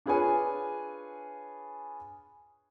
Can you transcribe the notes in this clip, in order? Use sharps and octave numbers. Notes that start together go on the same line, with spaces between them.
D4 F4 G#4 B4 C#5 G#5